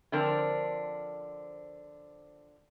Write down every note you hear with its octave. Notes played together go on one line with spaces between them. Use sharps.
D3 F3 C4 D4 A#4